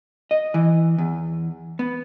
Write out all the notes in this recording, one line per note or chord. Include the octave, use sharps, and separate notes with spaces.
D#5
E3
E2
B3